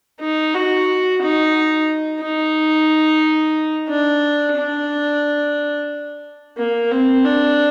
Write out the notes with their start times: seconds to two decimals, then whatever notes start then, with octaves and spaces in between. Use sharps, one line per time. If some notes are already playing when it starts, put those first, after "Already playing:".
0.20 D#4
0.54 F#4
1.22 D#4
2.23 D#4
3.89 D4
4.57 D4
6.58 A#3
6.91 C4
7.25 D4